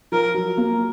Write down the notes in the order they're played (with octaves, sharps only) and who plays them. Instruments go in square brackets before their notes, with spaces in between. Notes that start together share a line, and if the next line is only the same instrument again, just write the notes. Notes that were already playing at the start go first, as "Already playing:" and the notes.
[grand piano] F3 [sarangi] A#4
[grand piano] F#3
A#3